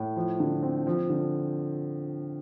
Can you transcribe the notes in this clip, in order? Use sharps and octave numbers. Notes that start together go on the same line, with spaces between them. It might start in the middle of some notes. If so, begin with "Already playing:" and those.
Already playing: A2
F3
D3
C4
F3
D3